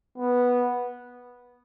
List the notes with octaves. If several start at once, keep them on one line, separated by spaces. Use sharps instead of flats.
B3